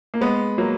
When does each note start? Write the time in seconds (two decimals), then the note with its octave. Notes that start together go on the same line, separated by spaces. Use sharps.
0.14 A#3
0.21 G#3 B3
0.58 F#3 A#3